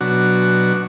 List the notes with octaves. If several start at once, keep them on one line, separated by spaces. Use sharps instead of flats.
B2 F#3 D4 F#4